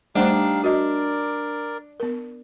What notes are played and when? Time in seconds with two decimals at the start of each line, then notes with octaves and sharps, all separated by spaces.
0.15 G3 A3 D4 D#4 G4 C5 F5
0.64 F#4 A#4 D5 D#5
2.00 B3 A#4